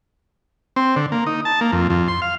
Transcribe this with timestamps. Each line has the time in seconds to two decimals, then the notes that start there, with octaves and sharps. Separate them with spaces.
0.76 C4
0.96 D3
1.12 A#3
1.27 D#4
1.45 A5
1.61 A#3
1.72 F2
1.90 F2
2.08 C6
2.22 F5